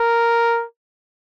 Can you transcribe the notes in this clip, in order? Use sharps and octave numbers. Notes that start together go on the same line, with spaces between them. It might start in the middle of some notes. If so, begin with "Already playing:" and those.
Already playing: A#4